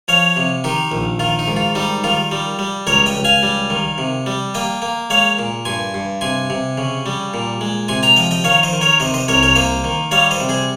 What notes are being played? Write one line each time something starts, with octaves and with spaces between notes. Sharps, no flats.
F3 C#5 F5
C3
D#3 D#4 G4
A#1
D#3 F4
D#4
G#2
F4
G3 D#4
D#3 F4
G3
G3
C#2 A#4 C#5
D#5 G5
C#2
F5 G#5
G3
D#3
C3
G3
A#3 D#5 G5
A#3
G#3 C#5 F5
A#2
G2 G#5 C6
G2
C3 G#5 C6
C3
C#3
G3
A#2
G#3
C3 G#5 C6
G5 A#5
F3 D#5 G5
D#5 G5
D#3 C#5 F5
C5 D#5
D#3
A#4 C#5
C3 C5 D#5
C5 D#5
C2 A#4 C#5
A#4 C#5
A#3 C5 D#5
D#3
G3 C#5 F5
C5 D#5
C3
G#4 C5